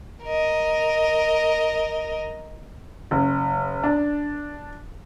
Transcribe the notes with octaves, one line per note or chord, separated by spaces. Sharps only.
A#4 D#5
F#1
D4